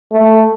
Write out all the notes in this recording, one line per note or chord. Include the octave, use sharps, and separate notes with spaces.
A3